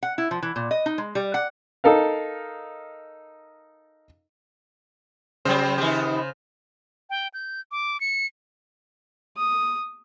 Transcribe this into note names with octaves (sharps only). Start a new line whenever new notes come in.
F#5
E4
F3
E3
A#2
D#5
D#4
G#3
G3
F#5
D#4 A4 A#4 F5
G2 C#3 F#3 C4 C5
D#3 B3 G4
G5
G6
D6
C#7
D#6